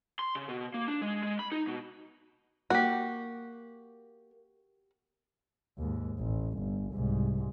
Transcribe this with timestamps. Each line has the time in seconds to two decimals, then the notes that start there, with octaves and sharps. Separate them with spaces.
0.19 C6
0.35 C#3
0.49 B2
0.74 A#3
0.88 D4
1.02 G#3
1.23 G#3
1.39 B5
1.52 D#4
1.67 B2
2.70 A#3 F#4 G4
5.78 D#2 G#2
6.19 A1
6.59 G1
6.94 C2 G#2